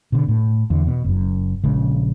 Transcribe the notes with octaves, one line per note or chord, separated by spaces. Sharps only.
B2 D3
A2
E2 D3
B2
F#1 F#2
A#1 C#3 G#3